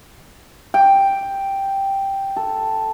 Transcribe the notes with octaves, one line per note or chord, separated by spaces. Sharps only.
G5
A4